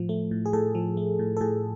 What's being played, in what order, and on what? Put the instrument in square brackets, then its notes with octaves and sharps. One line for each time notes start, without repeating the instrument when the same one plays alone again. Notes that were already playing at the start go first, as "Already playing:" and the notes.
Already playing: [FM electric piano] A2 F3
A3
A2
G#4
A2 A4
F3
A3
A2
A4
A2 G#4